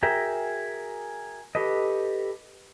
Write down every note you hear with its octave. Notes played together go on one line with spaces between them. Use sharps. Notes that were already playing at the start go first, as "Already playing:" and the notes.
F#4 G#4 A#4 E5 G5
G4 A4 B4 D#5